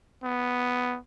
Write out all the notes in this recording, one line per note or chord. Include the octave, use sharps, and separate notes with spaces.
B3